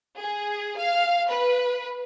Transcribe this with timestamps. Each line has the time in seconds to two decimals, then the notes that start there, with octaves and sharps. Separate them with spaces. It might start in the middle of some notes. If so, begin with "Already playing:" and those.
0.17 G#4
0.77 F5
1.28 B4